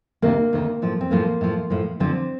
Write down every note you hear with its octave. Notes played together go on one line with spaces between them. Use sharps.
D2 C3 D#3 A#3
D2 C3 D#3
A2 F3
C4
A2 F3 A#3
A2 F3
A2 F3
D2 D3 F3 C4